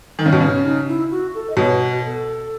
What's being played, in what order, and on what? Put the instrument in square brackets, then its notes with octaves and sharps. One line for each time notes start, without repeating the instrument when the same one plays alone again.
[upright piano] D#3
C#3
B2
[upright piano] C#3 [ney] C#4
[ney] D#4
E4
F#4
A4
D#5
[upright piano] B2 [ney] C#5
[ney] B4
B4
A4